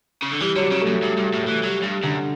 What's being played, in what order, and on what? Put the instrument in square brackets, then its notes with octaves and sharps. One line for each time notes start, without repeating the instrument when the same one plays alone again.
[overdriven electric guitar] C#3
D3
[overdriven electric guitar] E3 [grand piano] G3
[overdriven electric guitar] D3 [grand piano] F#3
[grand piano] G3
[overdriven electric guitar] C#3
[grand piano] A3
[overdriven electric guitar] F#2
[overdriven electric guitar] G2 [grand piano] G3
[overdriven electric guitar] G2
[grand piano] G3
[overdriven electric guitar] A2
[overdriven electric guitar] E3 [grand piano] A3
[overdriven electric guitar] F#3 [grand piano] G3
[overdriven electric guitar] G2 [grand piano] G3
[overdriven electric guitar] F#2 [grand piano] D3